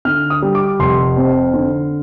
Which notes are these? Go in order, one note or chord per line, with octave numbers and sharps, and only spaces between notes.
D3 F6
D#6
G3
D6
F1 C6
F2
D3